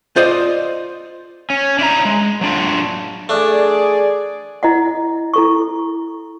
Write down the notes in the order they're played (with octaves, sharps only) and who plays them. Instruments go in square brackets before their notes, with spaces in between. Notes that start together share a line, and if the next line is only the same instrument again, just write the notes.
[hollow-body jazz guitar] F4 C5 D5 D#5
[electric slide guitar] C#4
D4 E4 A#5
G#3
F#3 D4 F4
[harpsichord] A3 D4 [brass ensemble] G#4 D5
[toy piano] E4 D#5 F#5
E4 A4 C#6